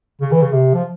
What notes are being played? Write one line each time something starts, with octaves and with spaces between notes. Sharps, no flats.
C#3
E3
C#3
C3
F3